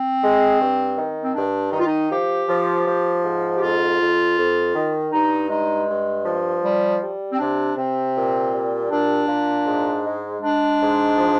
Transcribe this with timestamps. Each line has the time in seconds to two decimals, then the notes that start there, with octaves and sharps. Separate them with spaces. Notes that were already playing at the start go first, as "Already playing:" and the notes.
Already playing: C4
0.21 G#3
0.59 G2
0.96 D#3
1.24 C4
1.35 G2 D4
1.72 D#3 D#4
1.80 F4
1.87 D#4
2.10 F3 G4
2.48 F3
2.86 F3
3.24 G#2
3.57 G4
3.61 F2 F4
3.99 F2
4.37 F2
4.75 D#3
5.12 G2 D#4
5.50 G#3 D#4
5.88 G2
6.25 F3
6.63 G3
7.01 G3
7.32 C4
7.38 C3 D4
7.76 C3 C4
8.15 A#2
8.52 G3
8.90 A#2 D4
9.28 A#2
9.65 G#2
10.04 G#3
10.41 G#3 D4
10.79 G#2
11.17 F3